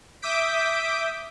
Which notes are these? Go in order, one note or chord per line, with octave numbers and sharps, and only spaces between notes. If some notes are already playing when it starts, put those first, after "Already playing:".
E5 D6 D#6 G6 B6 D7